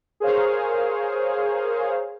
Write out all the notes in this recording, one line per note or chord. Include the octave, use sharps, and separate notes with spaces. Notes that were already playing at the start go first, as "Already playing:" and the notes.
G#4 A#4 C5 C#5 F5